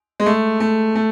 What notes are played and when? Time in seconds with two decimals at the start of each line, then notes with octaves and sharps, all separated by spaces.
0.20 G#3
0.26 A3
0.60 A3
0.95 A3